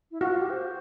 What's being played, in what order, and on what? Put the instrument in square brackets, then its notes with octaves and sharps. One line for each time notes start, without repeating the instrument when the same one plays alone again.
[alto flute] E4
[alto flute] F4 [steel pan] F#4
[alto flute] F4
G4
C5